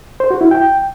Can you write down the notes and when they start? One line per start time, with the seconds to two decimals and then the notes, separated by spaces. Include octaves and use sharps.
0.20 C5
0.31 F#4
0.41 E4
0.51 G5